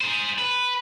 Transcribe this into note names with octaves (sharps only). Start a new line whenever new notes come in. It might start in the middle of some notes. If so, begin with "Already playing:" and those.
G#4 C5
B4